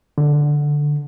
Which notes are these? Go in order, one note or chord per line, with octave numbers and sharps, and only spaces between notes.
D3